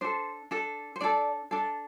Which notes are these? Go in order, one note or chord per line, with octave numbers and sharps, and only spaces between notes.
D4 A4 C5
D4 A4
C5
D4 A4 D5
D4 A4